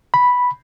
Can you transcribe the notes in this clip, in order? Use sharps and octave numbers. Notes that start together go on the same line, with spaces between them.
B5